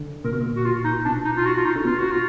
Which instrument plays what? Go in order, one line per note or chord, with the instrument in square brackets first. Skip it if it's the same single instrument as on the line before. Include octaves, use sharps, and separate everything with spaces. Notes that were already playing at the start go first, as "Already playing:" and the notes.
Already playing: [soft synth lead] D3
[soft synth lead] A#2 [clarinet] A#4
[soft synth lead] B2
A#2
[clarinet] F#4
F4
D#4
[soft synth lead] B2 [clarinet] D4
[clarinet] D#4
F4
F#4
F4
D#4
[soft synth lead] D3
[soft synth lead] B2 [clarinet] F4
[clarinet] F#4
F4